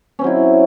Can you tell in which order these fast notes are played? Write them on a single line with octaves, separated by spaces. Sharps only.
C#4 C4 F#3 E4